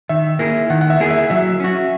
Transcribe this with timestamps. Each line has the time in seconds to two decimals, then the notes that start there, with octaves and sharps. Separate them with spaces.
0.09 D#3 E5
0.39 A#3 E4 G#4
0.70 D#3 F#5
0.81 F#5
0.90 E5
1.00 A#3 E4 G#4
1.11 E5
1.30 F#3 E5
1.60 C#4 F#4